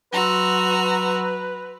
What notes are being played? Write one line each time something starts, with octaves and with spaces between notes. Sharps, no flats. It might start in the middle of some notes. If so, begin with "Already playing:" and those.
F#3 F#4 B4 A#5 C6 E6